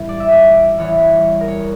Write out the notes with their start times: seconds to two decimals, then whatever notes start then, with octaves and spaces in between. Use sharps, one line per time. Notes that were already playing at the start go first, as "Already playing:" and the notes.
Already playing: A2 E3 G3
0.09 D5
0.20 E5
0.32 D5
0.78 E2 E3 G3 C#5
1.40 A#4
1.48 C#5